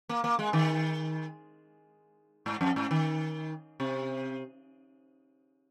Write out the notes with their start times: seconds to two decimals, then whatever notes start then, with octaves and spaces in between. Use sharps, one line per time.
0.09 A#3
0.24 A#3
0.39 G#3
0.53 D#3
2.46 G#2
2.61 F2
2.76 G#2
2.91 D#3
3.80 C3